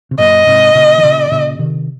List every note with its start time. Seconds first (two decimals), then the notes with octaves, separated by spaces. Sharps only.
0.11 C3
0.19 F#2 A#2 D#5
0.47 G#2 C3
0.75 A#2 C#3
0.98 D#3
1.03 A#2 C#3
1.32 A#2 C#3
1.59 C3 D#3